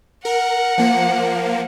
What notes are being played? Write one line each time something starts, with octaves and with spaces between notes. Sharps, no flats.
A#4 F#5
F3 A#3